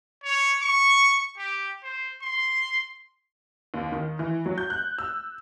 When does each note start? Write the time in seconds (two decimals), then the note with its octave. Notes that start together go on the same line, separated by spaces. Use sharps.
0.24 C#5
0.62 C#6
1.38 G4
1.83 C5
2.22 C6
3.74 D#2
3.92 D#3
4.19 E3
4.46 F#3
4.58 G6
4.70 F#6
4.98 E6